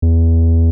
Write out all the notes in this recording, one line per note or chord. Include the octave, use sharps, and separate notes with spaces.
E2